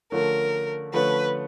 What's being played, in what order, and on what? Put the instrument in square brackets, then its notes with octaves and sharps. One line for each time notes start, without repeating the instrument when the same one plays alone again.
[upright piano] D3 F3 A3 C#4 [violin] A#4
[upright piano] D3 F3 A3 C#4 [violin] B4